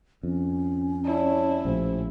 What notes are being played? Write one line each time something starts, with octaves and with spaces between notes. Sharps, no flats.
F2 C#4
E4 C#5 D5 A5
A#1 A2 F3 G4 C5